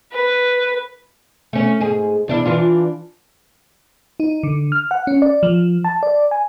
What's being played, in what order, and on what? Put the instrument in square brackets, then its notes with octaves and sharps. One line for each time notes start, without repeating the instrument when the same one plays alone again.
[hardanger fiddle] B4
[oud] A3 C#4
G#2 G#4
E2 D4 E4
E3 D4 F4
[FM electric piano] D#4
D3
F6
F#5
C#4
D5
F3
A5
D5
G#5